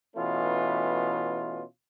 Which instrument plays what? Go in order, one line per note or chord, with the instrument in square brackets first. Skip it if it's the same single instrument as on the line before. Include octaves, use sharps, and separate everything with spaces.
[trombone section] B2 E3 A3 C#4 F4